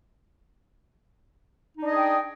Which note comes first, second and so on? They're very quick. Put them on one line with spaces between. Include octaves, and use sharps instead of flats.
D#4 D4 D#5 G#4 G5